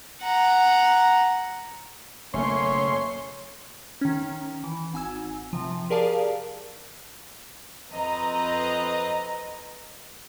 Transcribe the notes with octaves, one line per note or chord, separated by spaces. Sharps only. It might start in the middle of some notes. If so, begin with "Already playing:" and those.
F#5 A#5
F#1 B2 A3 A#3 C#4 C#5 C6
D#3 C#4
E3
G#1 G#5 E6
C3 F3
G4 G#4 A#4 D5 F5 A5
F2 C4 B4 D#5 A#5